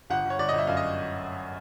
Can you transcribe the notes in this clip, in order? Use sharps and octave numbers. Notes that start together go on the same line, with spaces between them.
G1 F#5
G1
C#5
G1 D5
D#5
G1 E5
F#2 F5
D#5